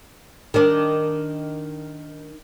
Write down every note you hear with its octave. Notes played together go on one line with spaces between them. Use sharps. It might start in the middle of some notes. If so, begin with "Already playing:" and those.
D#3 D4